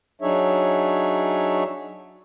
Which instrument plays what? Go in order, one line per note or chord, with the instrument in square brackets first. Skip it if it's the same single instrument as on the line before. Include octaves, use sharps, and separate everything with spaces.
[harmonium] F#3 D4 D#4 G#4 C#5 E5